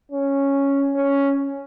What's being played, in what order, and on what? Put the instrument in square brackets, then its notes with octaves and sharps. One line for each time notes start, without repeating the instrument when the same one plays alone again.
[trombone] C#4
C#4